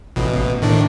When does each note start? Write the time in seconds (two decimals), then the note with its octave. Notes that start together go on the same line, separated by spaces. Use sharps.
0.16 A1 B2
0.62 A2 D#3 D4